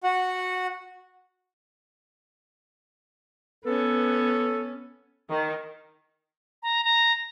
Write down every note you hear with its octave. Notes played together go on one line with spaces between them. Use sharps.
F#4 F#5
B3 C#4 A4 B4
D#3
A#5
A#5